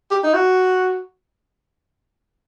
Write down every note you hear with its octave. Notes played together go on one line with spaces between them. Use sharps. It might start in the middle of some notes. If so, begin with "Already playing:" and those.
G4
D#4
F#4